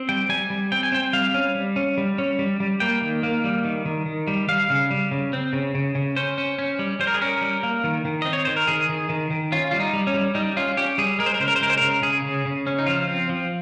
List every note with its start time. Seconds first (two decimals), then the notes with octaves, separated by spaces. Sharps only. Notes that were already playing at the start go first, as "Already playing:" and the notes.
Already playing: C4
0.09 G3 G5
0.29 G3 G#5
0.50 G3
0.72 C4 G5
0.83 G#5
0.92 C4 G5
1.13 G3 F5
1.34 C#4
1.55 G3
1.76 C#4
1.98 G3
2.18 C#4
2.39 G3
2.60 G3
2.80 A#3 G5
3.01 D#3
3.23 A#3
3.44 G3
3.65 D#3
3.86 D#3
4.06 D#3
4.27 G3
4.49 G3 F5
4.70 C#3
4.91 G3
5.11 C#3
5.33 C4
5.53 C#3
5.75 C#3
5.95 C#3
6.16 C#4 C5
6.38 C#4
6.58 C#4
6.79 G3
6.99 G3 C5
7.07 A#4
7.14 G#4
7.21 C#4 A#4
7.41 G3
7.63 A#3
7.84 D#3
8.05 D#3
8.22 C4 D#5
8.33 C#5
8.45 D#3 C5
8.56 A#4
8.67 D#3 G#4
8.89 D#3
9.09 D#3
9.30 D#3
9.52 C#4 F4
9.71 G3 F4
9.80 D#4
9.93 G3
10.07 C#4
10.14 G3
10.35 G3 D#4
10.57 C#4 F4
10.77 C#4 G4
10.98 G3 G#4
11.19 G#3 A#4
11.26 C5
11.34 A#4
11.40 C#3 C5
11.48 A#4
11.56 C5
11.61 G#3 A#4
11.70 C5
11.77 C#3 A#4
12.02 C#3 G#4
12.24 C#3
12.45 C#3
12.67 C#4
12.79 D#4
12.86 F3 F4
13.08 C4
13.29 F3